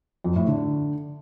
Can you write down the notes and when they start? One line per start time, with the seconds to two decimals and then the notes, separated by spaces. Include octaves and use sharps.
0.24 F2
0.36 A2
0.47 D3